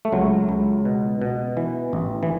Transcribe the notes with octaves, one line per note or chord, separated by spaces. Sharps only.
A3
C#2 F#3
C#2
B2
B2
E3
A1
E3